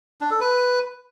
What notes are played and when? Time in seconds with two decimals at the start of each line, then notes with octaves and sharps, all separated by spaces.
0.21 D4
0.31 A4
0.40 B4